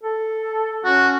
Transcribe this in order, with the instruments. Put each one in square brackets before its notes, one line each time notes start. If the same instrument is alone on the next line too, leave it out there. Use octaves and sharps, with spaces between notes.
[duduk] A4
[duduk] C#4 [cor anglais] F#4